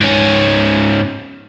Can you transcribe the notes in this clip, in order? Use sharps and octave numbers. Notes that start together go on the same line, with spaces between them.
G#2 C#4